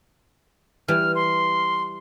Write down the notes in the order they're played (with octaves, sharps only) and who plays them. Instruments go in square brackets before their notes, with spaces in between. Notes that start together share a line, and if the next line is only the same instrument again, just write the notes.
[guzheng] E3 G3 [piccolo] F6
[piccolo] C6